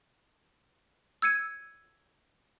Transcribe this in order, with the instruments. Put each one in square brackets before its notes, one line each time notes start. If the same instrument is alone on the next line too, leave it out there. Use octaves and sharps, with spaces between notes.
[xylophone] E6 G#6 C#7 D#7